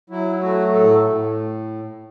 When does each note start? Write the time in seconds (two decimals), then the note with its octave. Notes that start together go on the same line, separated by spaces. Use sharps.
0.10 F#3 E4
0.41 A3 F#4
0.73 A2 A4
1.05 A2